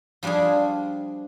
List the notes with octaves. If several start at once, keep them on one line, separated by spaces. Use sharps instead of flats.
F3 G3 D4 F4 G#4